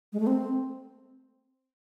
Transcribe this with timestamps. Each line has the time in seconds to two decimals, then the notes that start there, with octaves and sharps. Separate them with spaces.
0.13 G#3
0.20 A3
0.27 C4